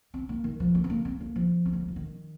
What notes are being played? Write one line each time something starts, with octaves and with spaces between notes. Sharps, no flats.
C4
A#3
D#3
F3
A#3
C4
A#3
C4
A#3
F3
C4
A#3
G3
F3
D#3